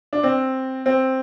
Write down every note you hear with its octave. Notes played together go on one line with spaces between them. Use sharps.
D4
C4
C4